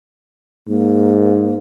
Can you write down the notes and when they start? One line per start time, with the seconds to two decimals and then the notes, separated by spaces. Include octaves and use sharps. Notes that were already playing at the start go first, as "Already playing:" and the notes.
0.68 G#2 A#3